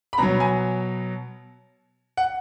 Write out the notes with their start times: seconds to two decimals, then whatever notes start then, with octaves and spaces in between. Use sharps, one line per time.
0.13 B5
0.18 B2 F#3 A#5
0.40 G#5
2.17 F#5